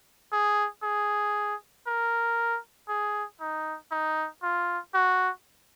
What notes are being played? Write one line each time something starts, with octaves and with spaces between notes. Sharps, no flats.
G#4
G#4
A#4
G#4
D#4
D#4
F4
F#4